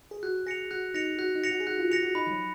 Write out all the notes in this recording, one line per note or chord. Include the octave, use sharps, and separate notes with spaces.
G#4
F#4 F#6
G#4 A#6 C#7 F7
F#4 F#6
D#4 A#6 C#7 F7
F#4 F#6
D#4
A#6 C#7 F7
F#4
G#4
F#4 F#6
F4
G#4 A#6 C#7 F7
F#4
D#4 B5
F3
F#3